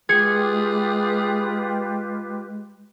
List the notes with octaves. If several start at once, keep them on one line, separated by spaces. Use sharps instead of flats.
G#3 F4 G4 G#4 B4 G#6 C#7